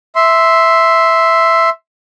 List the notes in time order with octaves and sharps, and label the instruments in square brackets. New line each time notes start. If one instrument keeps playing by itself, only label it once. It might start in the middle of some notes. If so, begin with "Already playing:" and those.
[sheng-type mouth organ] E5 C6